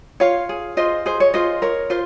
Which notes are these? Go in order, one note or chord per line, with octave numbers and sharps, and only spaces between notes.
F4 C#5 F5
G#4
F4 C5 D#5
G#4 C5
C#5
F4 C5 D#5
A#4 C#5
F4 C5